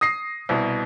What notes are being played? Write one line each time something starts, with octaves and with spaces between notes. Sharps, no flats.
D#6 A#6 C7
C2 B2